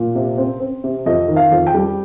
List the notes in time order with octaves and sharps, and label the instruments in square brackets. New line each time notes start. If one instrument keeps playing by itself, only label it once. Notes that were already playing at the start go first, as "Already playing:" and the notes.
Already playing: [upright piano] A#2
C3
C4
C4
C3
F2 D#5
D#3
F5
F2
G5
G3